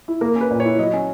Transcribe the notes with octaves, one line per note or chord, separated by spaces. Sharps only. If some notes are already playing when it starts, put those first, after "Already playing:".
E4
A#3 A#4
C#4
B4
A#2
C#5
E4
F#3 D#5
C#4